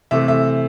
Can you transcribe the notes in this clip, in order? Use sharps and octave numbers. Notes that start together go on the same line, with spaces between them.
C3 E3 A3 E5
E5